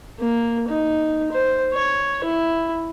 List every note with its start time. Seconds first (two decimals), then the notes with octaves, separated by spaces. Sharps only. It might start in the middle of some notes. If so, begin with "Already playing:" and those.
0.20 A#3
0.68 D#4
1.32 C5
1.73 C#5
2.24 E4